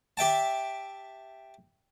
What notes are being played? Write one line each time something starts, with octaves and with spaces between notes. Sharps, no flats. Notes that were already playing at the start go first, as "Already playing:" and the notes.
G4 E5 G5 A5